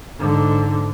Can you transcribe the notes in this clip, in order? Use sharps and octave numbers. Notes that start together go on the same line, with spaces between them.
G#2 D3